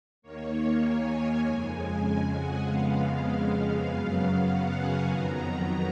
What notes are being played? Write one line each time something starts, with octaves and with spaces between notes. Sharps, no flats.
D#2 D#3 A#3 C#5
G#5
F2 C#3 G#3
G#5
F#5
F2 C#3 G#3 B3 F5
F#2 C#3 F#3 B3 F5
F#5
G#5
F2 D#3 F#3 B3 A#5
A#5